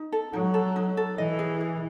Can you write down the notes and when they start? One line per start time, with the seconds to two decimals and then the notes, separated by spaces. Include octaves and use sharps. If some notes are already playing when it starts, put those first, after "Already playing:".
Already playing: D#4
0.12 A4
0.33 F#3 D#4
0.54 A4
0.76 D#4
0.97 A4
1.18 E3 D#5
1.39 G#4
1.61 G#4